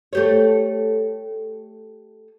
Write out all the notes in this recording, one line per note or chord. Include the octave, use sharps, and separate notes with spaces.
A3 G4 C#5